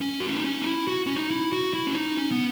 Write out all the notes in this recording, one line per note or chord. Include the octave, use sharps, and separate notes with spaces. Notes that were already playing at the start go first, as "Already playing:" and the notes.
C#4
F#4
E4
D#4
C#4
D#4
E4
F#4
C#4
D#4
E4
F#4
E4
C#4
D#4
C#4
B3